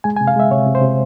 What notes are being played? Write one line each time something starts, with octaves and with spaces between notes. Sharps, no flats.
G#3 G#5
G#5
C3
F5
G#3 E5
C3 C#5
C3
C5
C3